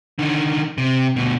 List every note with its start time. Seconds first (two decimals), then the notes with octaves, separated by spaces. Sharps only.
0.19 D3 D#3
0.78 C3
1.16 D2 B2